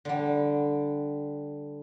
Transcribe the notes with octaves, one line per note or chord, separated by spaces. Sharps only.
D3 G3